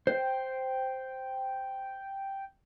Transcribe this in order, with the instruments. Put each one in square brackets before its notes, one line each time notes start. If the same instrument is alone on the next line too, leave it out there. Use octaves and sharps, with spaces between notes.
[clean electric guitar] C5 [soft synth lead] G5